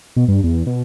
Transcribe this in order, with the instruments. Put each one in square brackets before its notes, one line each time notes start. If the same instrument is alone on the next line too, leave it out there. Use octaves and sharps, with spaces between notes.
[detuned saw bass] B2
G2
E2
B2